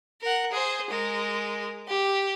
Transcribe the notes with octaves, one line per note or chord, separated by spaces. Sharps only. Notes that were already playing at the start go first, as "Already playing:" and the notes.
A#4 F#5
G#4 C5
G#3 A#4
G4